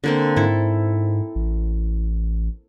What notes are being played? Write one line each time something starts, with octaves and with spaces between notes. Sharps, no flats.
D3 A#3 C4
G#2 E4 A4
A1